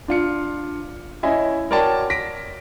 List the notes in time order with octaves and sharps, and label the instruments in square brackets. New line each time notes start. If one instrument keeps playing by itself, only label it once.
[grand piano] D4 F4 C#7
C#4 E4 D#5 E5 G#5
F#4 A#4 C#5 D5 G5 A5
A#6 B6 D7